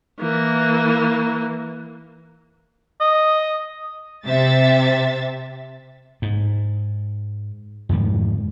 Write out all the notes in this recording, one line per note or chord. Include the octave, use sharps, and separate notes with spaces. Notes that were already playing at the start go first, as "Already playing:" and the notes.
E3 A#3
D#5
C3 E5 A6
G#2
F2 G#2 D3 D#3